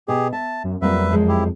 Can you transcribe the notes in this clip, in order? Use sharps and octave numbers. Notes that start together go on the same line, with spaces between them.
B2 G4 G#4
E5 A5
F#2
F2 F#3 G3 A#3 B4 E5
F#2 F3 G#3
E4 G4